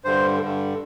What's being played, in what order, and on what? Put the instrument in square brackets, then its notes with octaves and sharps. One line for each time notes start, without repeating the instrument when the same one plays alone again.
[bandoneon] G2 D3 C5
G2 D3